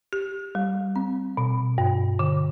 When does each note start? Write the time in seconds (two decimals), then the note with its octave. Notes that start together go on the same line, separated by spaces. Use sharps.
0.13 G4
0.55 G3
0.96 C4
1.37 B2
1.78 G2
2.19 D3